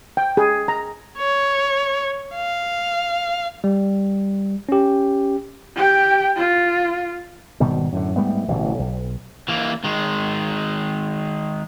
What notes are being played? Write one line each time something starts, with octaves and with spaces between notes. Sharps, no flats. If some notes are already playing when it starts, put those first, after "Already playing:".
G5
G#4
A#5
C#5
F5
G3
C#4 G4
G4 G5
F4
G#1 B2 D#3 G3
F#2 A2 D3
G#2 G3 A3 B3
D1 A1 B2 E3
B1
E3 A#3
D#3 G#3